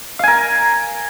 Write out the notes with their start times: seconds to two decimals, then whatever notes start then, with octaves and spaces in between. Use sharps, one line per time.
0.19 F5
0.23 G#5
0.28 A#4